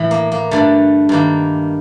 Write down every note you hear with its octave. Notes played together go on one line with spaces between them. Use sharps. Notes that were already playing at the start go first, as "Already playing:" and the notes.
Already playing: A2 E3
A#3
A#3
G2 D3 A3
G2 D#3 A#3